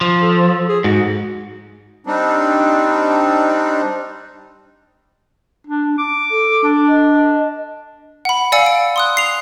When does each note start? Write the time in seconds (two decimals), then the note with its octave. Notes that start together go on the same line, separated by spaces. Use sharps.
0.01 F3
0.22 A4
0.69 G#4
0.84 G#2 F#4
2.07 G3 C4 D4 D#4
5.67 D4
5.98 D6
6.30 A4
6.63 D4
6.88 D#5
8.25 F#5 B5
8.52 D5 F5 G#5 E6 C#7
8.66 D7
8.96 C6 D#6 F#6
9.17 C7 F7